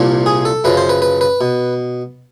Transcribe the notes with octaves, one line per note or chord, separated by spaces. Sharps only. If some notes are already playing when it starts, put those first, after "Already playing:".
Already playing: C2 A#2 F3
G#4
A4
F#2 C#3 F3 B4
C5
B4
B4
B4
B2